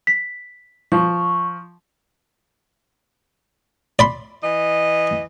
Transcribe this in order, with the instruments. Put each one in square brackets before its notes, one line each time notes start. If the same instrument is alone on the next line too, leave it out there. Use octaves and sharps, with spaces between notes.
[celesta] B6
[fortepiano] F3 [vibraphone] C#6
[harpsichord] D5 B5 C6
[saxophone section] E3 D#5